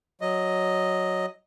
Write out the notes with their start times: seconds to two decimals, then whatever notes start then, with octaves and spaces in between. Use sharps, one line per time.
0.21 F#3 D#5